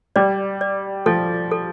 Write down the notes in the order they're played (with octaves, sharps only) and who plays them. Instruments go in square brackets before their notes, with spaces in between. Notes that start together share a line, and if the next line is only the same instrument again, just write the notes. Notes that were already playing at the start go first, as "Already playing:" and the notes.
[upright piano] G3 [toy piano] D5
[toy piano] D5
[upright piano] F3 [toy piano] A4
[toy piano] A4